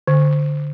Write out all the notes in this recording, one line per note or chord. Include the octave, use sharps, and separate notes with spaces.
D3